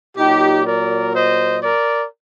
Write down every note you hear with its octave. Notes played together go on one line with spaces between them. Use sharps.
A#2 F#3 D#4 G4
A#4 D5
C5 D#5
A#4 D5